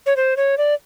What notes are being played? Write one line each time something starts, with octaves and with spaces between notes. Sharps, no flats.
C#5
C5
C#5
D5